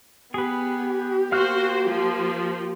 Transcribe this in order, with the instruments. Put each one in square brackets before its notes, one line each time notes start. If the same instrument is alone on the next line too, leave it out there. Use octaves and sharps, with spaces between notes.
[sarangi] B3 [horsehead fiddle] G4 [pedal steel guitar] G#4 B4
[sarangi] A#3 [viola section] F#4 C5 [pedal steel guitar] F5 F6 F#6
[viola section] F3